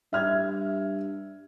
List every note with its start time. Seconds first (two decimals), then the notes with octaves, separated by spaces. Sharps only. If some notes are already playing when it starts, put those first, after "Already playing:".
0.13 G2 E5 F6 G#6